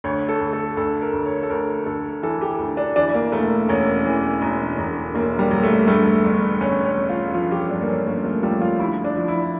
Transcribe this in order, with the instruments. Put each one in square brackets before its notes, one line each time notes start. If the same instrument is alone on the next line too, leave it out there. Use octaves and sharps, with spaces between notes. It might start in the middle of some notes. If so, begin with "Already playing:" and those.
[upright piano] D2 C#5
A4
D2
A4
D2 A4
A#4
D2
C#5
A4
D2 A#4
D2 A4
E3 A4
G4
D2
D4
E3 D4
A#3
E1 A3
E1 C#4
E3
E1
E1
E1 A#3
G3
E1
A3
G2 A3
G1
G1 C#4
C#4
G1
F4
F3 F4
G4
G2 D4
A#3
C#4
G1 A#3
A3
F3 G3
F4
D2 E4
D4
F3
E4